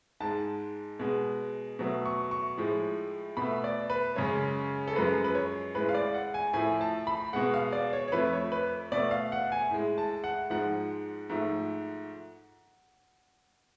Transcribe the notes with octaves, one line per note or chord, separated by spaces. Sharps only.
G#2 G#3 A5
B2 G#3
B2 F#3 A3
C#6
C#6
A2 F3 G#3
B2 B5
A3
D5
B4
F#2 C#3 G#3 C#5
A4
F#2 F3 G#3 B4
B4
C#5
A2 G#3 B4
F5
D5
F#5
G#5
A2 F3 A3 G#5
A5
B5
B2 G#3 F#5
F5
D5
C#5
C#5
F2 F3 A3 B4
C#5
B4
B2 A3 D5
F5
F#5
G#5
A2 G#3
A5
F#5
G#2 F3 G#3 F#5
G#2 F3 A3